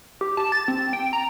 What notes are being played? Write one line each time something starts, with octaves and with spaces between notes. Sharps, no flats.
G4
A5
A6
C4
G5
A#5